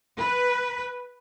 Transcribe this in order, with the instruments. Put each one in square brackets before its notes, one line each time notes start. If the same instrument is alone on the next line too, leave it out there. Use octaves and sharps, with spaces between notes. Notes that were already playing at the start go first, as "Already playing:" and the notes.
[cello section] B4